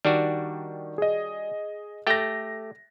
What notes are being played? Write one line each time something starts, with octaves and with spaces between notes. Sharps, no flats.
D#3 G3 D4 F#4
G#4 D#5
A3 G4 G5 A6 A#6